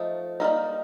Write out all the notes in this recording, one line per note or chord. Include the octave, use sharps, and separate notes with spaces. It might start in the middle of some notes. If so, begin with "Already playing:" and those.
Already playing: F3 A3 D#4
G3 A#3 D#4